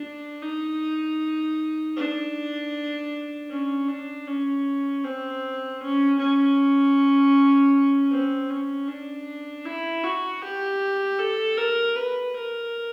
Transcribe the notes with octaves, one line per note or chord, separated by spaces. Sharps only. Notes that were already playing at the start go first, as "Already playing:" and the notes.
Already playing: D4
D#4
D4
C#4
D4
C#4
C4
C#4
C#4
C4
C#4
D4
E4
F#4
G4
A4
A#4
B4
A#4